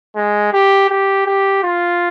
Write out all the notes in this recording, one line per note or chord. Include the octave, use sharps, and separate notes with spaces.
G#3
G4
G4
G4
F4